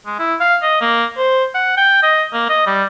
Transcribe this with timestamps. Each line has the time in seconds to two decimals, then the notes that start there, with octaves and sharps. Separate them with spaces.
0.06 G#3
0.19 E4
0.40 F5
0.62 D#5
0.81 A#3
1.17 C5
1.54 F#5
1.77 G5
2.02 D#5
2.33 A#3
2.49 D#5
2.66 G3